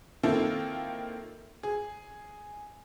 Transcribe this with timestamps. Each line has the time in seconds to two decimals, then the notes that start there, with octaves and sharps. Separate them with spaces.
0.23 D#3 A#3 C4 E4 F4 A4
1.63 G#4